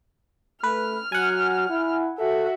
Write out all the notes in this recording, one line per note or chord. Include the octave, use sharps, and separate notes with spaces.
A3 B4 F6
F#3 F#5 G#5
E4
F#4 A4 E5